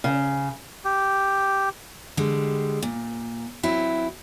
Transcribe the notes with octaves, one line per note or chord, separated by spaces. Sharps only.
C#3
G4
D3 G3 G#3
A#2
F#3 C4 E4